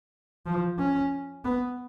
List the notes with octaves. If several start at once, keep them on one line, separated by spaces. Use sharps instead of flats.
F3
C#4
B3